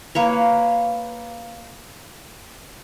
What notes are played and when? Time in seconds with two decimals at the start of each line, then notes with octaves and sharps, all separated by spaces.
0.15 A#3 B4 C#5